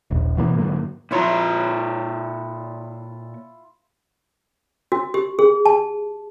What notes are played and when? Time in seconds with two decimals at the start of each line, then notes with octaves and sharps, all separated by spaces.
0.10 D#1 A#1
0.37 B2 E3 F#3 A#3
0.55 G#2 D3 F#3 A#3
1.11 A#2 E4 F4 C#5 E5 A#5
4.92 F#4
5.14 G4
5.39 G#4
5.66 A5